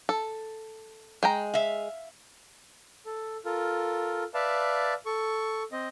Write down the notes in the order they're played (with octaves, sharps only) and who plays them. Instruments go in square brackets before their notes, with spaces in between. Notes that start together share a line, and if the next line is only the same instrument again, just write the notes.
[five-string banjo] A4
G#3 G5 A#5
[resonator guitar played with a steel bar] E5 F5
[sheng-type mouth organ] A4
F4 A4 A#4
B4 D5 E5 F5 A5
A4 C#6
C4 D#5